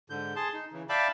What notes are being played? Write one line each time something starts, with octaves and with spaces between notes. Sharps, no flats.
G#2 D3 G6
G#4 A5 C6
D#4
C#3 E3
D5 E5 F5 G5 A5 B5